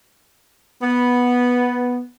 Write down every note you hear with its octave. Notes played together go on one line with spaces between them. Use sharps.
B3